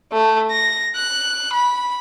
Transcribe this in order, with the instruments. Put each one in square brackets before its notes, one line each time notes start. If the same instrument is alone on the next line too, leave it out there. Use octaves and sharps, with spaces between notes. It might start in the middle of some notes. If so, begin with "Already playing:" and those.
[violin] A3
A#6
F#6
B5